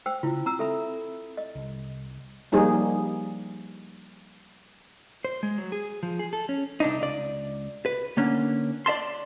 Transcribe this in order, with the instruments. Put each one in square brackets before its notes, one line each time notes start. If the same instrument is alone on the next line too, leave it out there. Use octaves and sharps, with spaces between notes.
[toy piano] C5 G5 E6
[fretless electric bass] C#3 [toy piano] E4 F4
[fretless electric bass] C4 [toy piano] A#5 E6
[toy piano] A4 E5 B5
D#5
[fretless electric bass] C2
[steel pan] F3 G3 A#3 D#4 G#4
[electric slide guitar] C5
G#3
F#3
G#4
F3
G#4
A4
C#4
[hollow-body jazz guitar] C2 D4 D#4
C#2 D5
B4
D3 A#3 C#4 D4
D5 E5 A5 C6